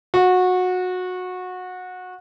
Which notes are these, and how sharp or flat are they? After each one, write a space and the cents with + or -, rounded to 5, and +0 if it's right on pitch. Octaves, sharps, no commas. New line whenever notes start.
F#4 -20